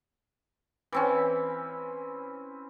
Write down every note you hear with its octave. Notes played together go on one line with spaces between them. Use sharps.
E3 C4 C#4